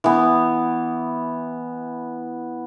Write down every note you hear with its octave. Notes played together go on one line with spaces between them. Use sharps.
E3 B3